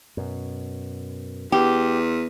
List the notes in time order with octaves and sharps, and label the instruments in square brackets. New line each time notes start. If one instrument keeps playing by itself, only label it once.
[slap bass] F#2 B2
[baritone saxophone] E2 [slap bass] B3 [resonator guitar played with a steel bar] G4